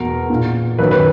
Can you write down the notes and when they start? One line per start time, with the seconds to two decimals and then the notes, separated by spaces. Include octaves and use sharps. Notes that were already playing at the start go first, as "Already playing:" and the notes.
Already playing: E2 B2 A#4
0.30 A#2
0.79 F#2 D#3 B4
0.91 B4